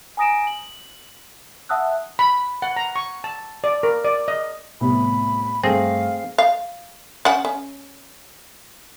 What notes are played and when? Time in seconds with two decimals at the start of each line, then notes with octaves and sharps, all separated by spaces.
0.17 G#5 A#5 D#6 A#6 D7 E7
0.47 F#7
1.69 E5 F#5 A5 D#6 E6 F#6
2.19 B5
2.62 F#5
2.77 A#5
2.96 C#6
3.24 A5
3.64 D5
3.83 A#4
4.05 D5
4.28 D#5
4.81 C2 A2 B3 B5
5.64 G2 A3 C4 G#4 F5 A#6
6.38 F5
7.25 C#4 F#5
7.45 C#4